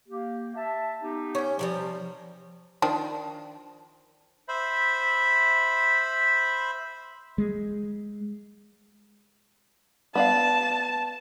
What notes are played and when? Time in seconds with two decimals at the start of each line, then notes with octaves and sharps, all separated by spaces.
0.09 A#3 G4
0.56 E5 A5
1.02 B3 D#4 G4
1.35 C#4 G5
1.59 C3 E3 F3 G3
2.82 D#3 F3 D4
4.48 C5 E5 B5
7.38 G#3
10.15 B3 D5 F5 A5